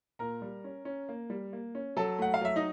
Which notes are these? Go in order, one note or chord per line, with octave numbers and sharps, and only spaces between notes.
A#2 A#4 A#5
G3
C#4
C#4
A#3
G3
A#3
C#4
F#3 A4 A5
A3 F#5
F5
F#3 E5
D#4 D#5